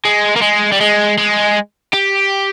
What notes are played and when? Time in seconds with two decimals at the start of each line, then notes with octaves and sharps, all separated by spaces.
0.05 G#3
0.36 A#3
0.42 G#3
0.72 G3
0.81 G#3
1.18 G#3
1.94 G4